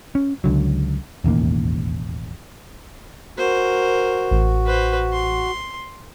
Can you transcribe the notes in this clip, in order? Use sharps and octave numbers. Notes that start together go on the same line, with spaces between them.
C#4
C#2 D3 F#3
E1 A1 D#2 A#3
F#4 A#4 C5
A1
B4 C5
C6